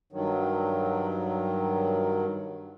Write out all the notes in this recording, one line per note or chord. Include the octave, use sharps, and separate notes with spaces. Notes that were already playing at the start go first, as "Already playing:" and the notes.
G2 D#3 F#3